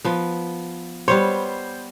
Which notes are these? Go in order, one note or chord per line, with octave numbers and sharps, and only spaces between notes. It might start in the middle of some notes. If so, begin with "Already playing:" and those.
F3 B3
G3 B3 C5 C#5 C6